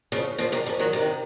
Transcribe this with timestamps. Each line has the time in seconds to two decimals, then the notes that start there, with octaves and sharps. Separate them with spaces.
0.12 C#3 F3
0.38 C#3 F3
0.52 C3 D#3
0.66 C#3 F3
0.79 D#3 F#3
0.93 C3 D#3